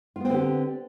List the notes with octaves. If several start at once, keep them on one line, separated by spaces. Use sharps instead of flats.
D3 B3 C4 F4 G4